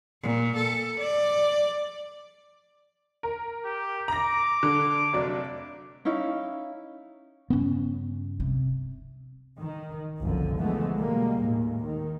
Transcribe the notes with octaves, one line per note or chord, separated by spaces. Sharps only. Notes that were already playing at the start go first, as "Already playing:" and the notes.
A#2
A4
D5
A#4
G4
A#5 D6 A#6
D3
F1 F#3 D4
C#4 D#4 E4 F5
G2 C#3 B3 C#4
C3
D#3
F#1 C2 D3 F3
D3 E3 F3 G#3 A3 B3
B2 G3 G#3 A#3
D#2 A2
D#3